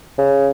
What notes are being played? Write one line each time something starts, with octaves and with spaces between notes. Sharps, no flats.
C#3